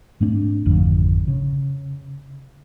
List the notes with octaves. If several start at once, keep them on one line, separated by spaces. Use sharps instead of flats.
G#2 A3 C4 D4
G#1 F2 D3
C#3